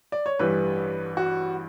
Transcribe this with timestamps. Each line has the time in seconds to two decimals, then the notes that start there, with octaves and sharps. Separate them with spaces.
0.12 D5
0.26 C#5
0.39 A1 G2 E3 G3 B4
1.17 F#4